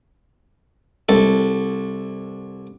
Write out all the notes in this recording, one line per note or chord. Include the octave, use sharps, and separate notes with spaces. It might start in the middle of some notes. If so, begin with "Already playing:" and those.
C2 A4